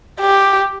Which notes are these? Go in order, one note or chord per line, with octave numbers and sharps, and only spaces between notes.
G4